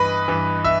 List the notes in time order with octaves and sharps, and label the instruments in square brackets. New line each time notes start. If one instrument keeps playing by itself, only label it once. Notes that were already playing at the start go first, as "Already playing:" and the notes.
Already playing: [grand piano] G2 E3 B4 D#5 B5
G2 E3
E5 E6